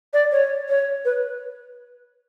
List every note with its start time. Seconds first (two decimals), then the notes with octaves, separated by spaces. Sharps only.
0.13 D5
0.32 C#5
0.69 C#5
1.05 B4